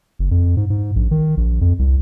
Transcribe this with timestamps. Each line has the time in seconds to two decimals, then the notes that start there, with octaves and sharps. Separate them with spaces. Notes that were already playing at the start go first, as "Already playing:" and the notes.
0.19 F#1
0.31 F2
0.57 G#2
0.70 G#2
0.96 A#1
1.11 D#3
1.37 A#1
1.61 F2
1.79 C2